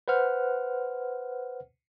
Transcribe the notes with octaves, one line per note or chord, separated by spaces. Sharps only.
B4 C5 F#5 F6